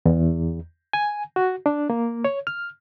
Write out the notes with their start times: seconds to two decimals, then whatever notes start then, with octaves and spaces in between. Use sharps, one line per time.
0.06 E2
0.93 G#5
1.36 F#4
1.66 D4
1.90 A#3
2.24 C#5
2.47 F6